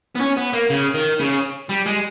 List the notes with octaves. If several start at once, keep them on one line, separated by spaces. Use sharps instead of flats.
B3
C#4
B3
A#3
C#3
D#3
C#3
G3
G#3